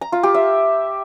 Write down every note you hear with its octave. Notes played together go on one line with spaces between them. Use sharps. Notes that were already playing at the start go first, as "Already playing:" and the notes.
A#5
F4
G4
E5